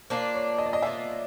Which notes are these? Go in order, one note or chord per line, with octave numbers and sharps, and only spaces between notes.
A#3 D4 F4 C5
C#5
D#5
D5
D#5
A#3 D4 F4 E5